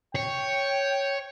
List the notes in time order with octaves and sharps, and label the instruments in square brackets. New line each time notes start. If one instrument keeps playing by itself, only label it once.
[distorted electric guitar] C#5 [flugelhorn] G5